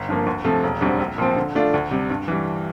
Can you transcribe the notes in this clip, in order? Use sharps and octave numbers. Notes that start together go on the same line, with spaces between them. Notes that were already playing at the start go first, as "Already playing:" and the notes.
Already playing: G1
G2 F3 A#3
D2
C3 F3 A3
E1
D2 D3 G3 C4
A#1
A#2 F3 C4
D3
A3 D4 F4
D2
C3 G3
G2
E3 G3